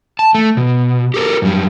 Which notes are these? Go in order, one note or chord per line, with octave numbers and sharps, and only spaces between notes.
A5
A3
B2
G4 A4 A#4
F#2 G3